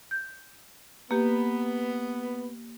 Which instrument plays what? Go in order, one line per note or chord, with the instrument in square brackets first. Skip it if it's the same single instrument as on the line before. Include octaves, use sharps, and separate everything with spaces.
[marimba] G6
[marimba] A#3 G4 [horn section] B3